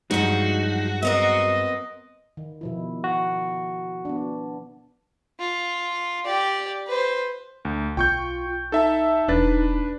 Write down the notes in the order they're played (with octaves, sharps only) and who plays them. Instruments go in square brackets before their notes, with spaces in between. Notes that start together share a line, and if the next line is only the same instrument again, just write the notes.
[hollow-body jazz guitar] G2 F#3 G#3 [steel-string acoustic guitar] F3 D#4 [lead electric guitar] F#4
[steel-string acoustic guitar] B3 C4 A#4 [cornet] D#5
[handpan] D#3
B2 F3 E4
[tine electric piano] F#4
[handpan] B3 D4
[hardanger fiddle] F4
G4 D5
B4 C5
[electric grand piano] D2
[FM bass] B1 [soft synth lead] F4 [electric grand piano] G5 C#6 G6
[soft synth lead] D#4 [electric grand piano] A4 E5 A5
[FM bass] E1 [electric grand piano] D4 B4 A6